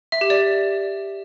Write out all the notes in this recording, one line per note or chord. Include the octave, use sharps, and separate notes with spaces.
E5
G4
D5